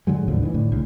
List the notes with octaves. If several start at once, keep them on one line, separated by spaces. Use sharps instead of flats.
G#2 D3 F#3 G#3
D#2 A2 D3 F3
D#3 E3
A2 D3
C2